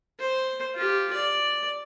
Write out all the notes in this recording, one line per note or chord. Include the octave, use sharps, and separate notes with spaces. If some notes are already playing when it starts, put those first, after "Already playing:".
C5
F4 G4
D5